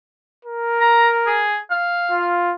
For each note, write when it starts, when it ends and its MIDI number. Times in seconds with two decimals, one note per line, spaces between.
0.45 1.47 70
0.81 1.10 82
1.26 1.57 68
1.71 2.32 77
2.11 2.55 65